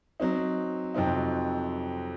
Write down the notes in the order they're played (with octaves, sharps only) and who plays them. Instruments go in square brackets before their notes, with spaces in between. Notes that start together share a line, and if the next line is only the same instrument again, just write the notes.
[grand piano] F#3 C4 D#4
F2 C3 F#3 C4 D#4